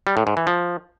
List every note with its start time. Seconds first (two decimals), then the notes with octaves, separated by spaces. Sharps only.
0.07 G3
0.17 A2
0.27 G#2
0.37 E3
0.47 F3